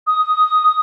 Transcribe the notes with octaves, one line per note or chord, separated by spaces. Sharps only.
D#6